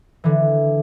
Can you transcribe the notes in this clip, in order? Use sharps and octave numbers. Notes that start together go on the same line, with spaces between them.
D3 E3